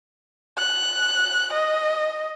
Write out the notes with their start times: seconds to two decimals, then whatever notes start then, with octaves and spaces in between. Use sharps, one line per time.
0.58 F#6
1.53 D#5